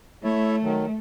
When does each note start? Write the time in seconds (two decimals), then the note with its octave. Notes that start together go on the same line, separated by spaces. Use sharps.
0.24 A3 E4 C#5 E5
0.62 D#3 F#3